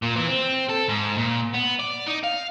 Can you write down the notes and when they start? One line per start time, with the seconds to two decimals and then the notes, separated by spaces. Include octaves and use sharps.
0.03 A#2
0.16 E3
0.28 C4
0.69 A4
0.89 G#2
1.18 A#2
1.54 B3
1.80 D5
2.07 D#4
2.24 F5